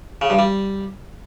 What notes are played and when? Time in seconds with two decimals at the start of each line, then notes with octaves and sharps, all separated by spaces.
0.21 C#3
0.30 G2
0.39 G3